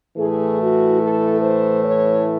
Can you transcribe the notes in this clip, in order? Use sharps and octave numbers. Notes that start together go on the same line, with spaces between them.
A2 E3 A3 G#4
F#4
A4
C5
C#5